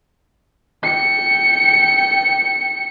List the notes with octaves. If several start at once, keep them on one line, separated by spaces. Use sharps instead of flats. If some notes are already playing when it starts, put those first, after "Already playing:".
G5 C#7